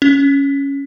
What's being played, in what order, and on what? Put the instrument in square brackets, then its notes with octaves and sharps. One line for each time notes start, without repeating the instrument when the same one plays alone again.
[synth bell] C#4